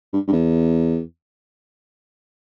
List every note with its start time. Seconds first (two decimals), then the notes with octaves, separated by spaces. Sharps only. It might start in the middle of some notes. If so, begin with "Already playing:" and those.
0.13 G2
0.28 G2
0.32 E2